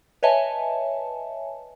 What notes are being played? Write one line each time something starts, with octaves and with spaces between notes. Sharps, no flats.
B4 C#5 D#5 E5 G#5 A5